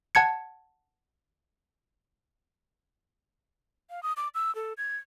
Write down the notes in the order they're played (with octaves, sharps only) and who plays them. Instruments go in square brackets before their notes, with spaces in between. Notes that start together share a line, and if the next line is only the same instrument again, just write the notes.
[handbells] F#5 A5 G#6 C#7
[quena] F5
D#6
D6
E6
A4
G#6